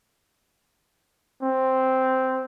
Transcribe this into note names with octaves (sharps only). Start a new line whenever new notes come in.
C4